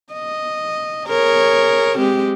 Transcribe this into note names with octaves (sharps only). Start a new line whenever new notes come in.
D#5
G#4 A#4 C#5
G#3 C4 G4